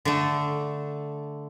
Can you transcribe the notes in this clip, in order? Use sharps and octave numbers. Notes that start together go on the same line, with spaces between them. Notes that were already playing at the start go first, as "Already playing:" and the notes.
D3 A3